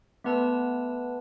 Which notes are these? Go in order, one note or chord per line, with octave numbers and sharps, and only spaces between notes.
A3 B3 B4 A5 E6